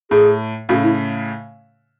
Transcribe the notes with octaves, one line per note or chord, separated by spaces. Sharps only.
A2 G#4
A2 C#3 F#4
E4